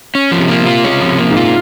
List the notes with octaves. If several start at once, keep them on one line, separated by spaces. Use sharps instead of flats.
C#4
F3
C3
A#3
C3
F4
C#3 C#4
F3
C3
A#3
G#2
F4